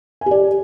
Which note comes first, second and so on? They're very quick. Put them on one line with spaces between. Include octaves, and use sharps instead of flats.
G#5 G4 D5